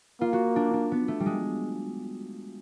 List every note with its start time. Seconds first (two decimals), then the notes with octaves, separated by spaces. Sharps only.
0.21 A#3 F4
0.33 F#4
0.56 D4
0.73 D4
0.92 B3
1.08 A3
1.20 G3
1.26 G#3